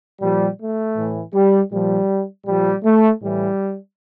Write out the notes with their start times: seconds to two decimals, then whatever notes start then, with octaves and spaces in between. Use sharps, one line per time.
0.21 A#2 F3 G3
0.59 A3
0.96 A2 E3
1.34 G3
1.72 A#2 F3 G3
2.46 A#2 F3 G3
2.84 A3
3.21 A2 E3 G3